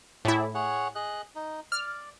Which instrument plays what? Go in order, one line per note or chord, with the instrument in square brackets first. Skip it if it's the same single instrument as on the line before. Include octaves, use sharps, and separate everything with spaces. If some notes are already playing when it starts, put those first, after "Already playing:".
[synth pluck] A2 E4 [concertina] G#4 D5
[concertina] G#4 C#5 F#5
G#4 D#5 F#6
D#4
[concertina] D5 [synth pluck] F6